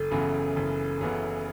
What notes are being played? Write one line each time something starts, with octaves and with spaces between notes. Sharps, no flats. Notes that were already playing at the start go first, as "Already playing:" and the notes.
Already playing: F#1 A4
F#2 C#3 E3 B3
F#1
F#2 C#3 E3 B3